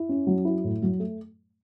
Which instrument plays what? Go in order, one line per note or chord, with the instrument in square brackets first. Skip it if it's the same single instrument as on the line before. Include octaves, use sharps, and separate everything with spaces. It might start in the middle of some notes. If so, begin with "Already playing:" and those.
Already playing: [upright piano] E4
C#4
F#3
E4
A2
F#3
A3